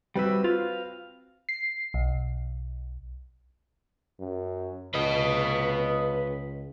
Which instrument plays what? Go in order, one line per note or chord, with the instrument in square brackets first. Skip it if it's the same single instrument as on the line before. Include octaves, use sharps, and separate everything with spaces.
[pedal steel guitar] G3 E5 [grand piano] C4 F#4 B4
[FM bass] F4 [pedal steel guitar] F5
[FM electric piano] C7
B1
[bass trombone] F#2
[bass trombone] C#2 [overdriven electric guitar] B4 D#5